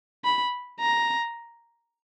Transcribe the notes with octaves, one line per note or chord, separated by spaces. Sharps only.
B5
A#5